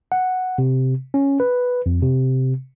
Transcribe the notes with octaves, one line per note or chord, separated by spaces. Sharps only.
F#5
C3
C#4
B4
F2
C3